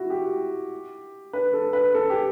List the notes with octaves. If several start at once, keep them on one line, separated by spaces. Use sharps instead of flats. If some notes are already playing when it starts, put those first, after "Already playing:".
Already playing: E4 F#4
G4
B4
A4
B4
A4
G4